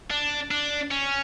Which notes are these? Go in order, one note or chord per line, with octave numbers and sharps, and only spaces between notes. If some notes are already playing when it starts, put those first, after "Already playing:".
D4
D4
C#4